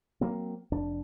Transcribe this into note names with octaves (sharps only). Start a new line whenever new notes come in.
F#3 A#3 C4
F1 F2 D4